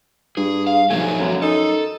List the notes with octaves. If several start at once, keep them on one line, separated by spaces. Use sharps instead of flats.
G2 G#4
F5
B1 F3 F#3 A3 G#5
F#2
D#4 A4